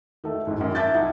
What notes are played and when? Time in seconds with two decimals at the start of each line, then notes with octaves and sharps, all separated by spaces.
0.24 D#3 A3
0.47 G#1 G#2
0.61 F#2 D#3
0.75 E5 A5 D6 F#6 G6 A6
0.94 C2 D#4 E4 F#5